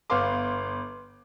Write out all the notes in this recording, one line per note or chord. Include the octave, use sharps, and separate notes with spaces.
G1 B3 F5 C6 D6